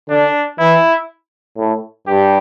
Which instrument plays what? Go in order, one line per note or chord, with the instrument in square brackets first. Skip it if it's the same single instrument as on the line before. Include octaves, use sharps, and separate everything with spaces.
[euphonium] D3 [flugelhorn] D4
[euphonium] E3 [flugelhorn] E4
[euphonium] A2
[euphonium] G2 [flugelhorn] G4